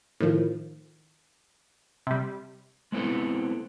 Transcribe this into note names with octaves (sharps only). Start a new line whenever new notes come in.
A2 D#3 F3
C3 G3
G#3 B3 C4 E4 A4